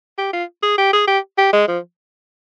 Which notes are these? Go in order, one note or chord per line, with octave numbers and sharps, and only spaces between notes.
G4
F4
G#4
G4
G#4
G4
G4
G#3
F3